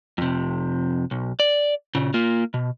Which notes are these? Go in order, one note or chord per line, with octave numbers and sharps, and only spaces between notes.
F2 C3
B1
D5
A#2 C#3
A#3 F4
B2